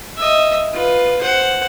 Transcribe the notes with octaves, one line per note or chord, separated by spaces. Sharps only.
D#5 E5
F4 B4
C5 F#5